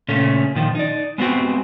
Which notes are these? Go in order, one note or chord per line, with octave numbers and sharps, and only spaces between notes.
A#2 C#3 A3 C#4
A#2 D#3 F3
D#4 D5
G#3 B3 C4 D#4 F#4 G4